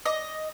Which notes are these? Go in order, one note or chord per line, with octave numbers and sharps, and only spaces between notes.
D#5